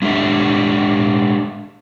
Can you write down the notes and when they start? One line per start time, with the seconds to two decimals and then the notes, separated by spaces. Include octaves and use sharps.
0.02 G#3 D4 G4 A4 E5